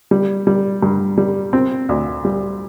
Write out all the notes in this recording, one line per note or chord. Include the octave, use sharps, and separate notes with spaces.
G3
G3
G2
G3
C4
D2
G3